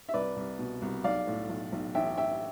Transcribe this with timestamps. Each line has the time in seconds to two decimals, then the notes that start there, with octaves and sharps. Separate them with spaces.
0.09 E5
0.14 C2 B4 D5
0.36 C2
0.59 B2
0.82 C2
1.04 B1 D5 F5
1.27 A2
1.49 B1
1.72 B1
1.95 A1 E5 G5
2.17 A1 E5 G5